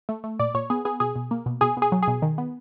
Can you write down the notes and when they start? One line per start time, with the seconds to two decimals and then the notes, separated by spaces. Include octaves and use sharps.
0.09 A3
0.24 A3
0.39 A#2 D5
0.54 A#2 C#5
0.70 B3 G#4
0.85 B3 G#4
1.00 B2 G#4
1.16 B2
1.31 A#3
1.46 B2
1.61 B2 G#4
1.77 B2
1.82 G#4
1.92 F#3
2.03 G#4
2.08 B2
2.22 D#3
2.38 B3